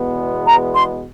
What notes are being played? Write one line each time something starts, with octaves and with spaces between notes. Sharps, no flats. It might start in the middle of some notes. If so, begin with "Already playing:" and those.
Already playing: E2 B2 G#3 B3
A#5
C6